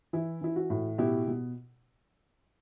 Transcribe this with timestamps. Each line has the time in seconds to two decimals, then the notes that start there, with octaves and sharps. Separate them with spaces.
0.13 E3 E4
0.41 E3 E4
0.56 F#4
0.70 A2
0.98 B2 E4 G4
1.28 B2